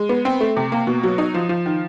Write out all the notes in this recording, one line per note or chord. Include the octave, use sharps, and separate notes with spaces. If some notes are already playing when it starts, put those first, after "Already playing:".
Already playing: G#3
B3
C4
A3
C3
A#3
B2
F#3
D#4
F3
F3
D#3